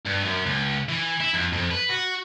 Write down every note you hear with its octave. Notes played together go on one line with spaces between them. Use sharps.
G2
F#2
C#2
E3
E4
F2
F2
B4
F#4